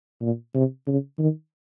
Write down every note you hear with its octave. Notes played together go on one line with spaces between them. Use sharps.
A#2
C3
C#3
D#3